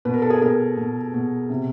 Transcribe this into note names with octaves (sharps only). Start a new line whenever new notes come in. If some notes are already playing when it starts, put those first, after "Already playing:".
B2 B4
A#4
A4
G#4 A#4
B2 G#4 A#4
B2
B2
C3